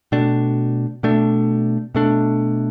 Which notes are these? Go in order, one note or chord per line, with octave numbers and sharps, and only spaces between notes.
B2 A3 D4
B2 A3 D4
B2 A3 D4